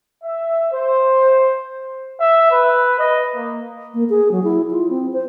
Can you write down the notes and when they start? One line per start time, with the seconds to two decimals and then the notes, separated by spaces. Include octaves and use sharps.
0.24 E5
0.72 C5
2.20 E5
2.52 B4
2.99 D#5
3.35 A#3
3.94 A#3
4.10 G#4
4.31 F#3
4.43 E4
4.71 F4
4.89 C4
5.13 C5